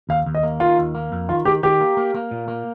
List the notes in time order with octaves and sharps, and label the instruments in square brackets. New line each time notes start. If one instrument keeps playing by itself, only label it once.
[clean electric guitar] D#2 [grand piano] F5
[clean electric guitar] D#2
[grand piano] D#5
[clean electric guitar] A#3
[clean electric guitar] D#3 [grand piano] F4
[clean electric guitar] D#2
A#3
F2
[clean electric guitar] D#3 [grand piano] F4
[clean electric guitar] D#3 [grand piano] G4
[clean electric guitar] D#3 [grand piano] G4
[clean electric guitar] A#3
A#3
A#3
A#2
A#3